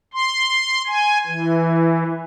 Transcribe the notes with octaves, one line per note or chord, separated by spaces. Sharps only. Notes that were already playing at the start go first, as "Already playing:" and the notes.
C6
G#5
E3